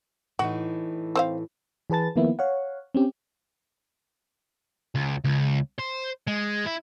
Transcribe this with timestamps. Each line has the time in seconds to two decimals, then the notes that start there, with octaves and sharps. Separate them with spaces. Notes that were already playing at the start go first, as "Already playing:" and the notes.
0.39 A2 E3 D#4 F#4
1.15 C4 C5 F5
1.90 E3 G#4 B4 A5 A6
2.16 D#3 F3 A#3 B3 E4
2.39 C#5 F5 F#5
2.95 C4 C#4 G4
4.95 C#2
5.24 C#2
5.79 C5
6.27 G#3
6.66 E4